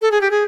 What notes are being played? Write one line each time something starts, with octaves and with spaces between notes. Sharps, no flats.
A4
G#4
G4
G#4